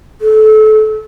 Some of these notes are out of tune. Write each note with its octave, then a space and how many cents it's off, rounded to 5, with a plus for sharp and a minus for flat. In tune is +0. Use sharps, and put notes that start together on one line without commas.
A4 -25